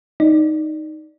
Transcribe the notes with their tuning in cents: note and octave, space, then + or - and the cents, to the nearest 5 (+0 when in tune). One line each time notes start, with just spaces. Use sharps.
D#4 +0 D5 +0